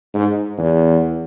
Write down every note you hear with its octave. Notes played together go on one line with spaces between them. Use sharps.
G#2
E2